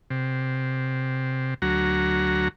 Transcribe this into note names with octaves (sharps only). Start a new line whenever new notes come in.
C3
D2 F#3 F#4 A#5